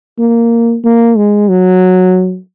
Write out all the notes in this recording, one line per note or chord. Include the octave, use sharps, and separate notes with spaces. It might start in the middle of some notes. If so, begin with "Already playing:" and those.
A#3
A#3
G#3
F#3